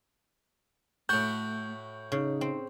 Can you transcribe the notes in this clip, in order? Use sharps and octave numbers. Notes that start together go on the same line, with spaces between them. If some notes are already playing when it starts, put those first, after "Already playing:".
A2 A3 F#4 G6
C#3 D#4
C4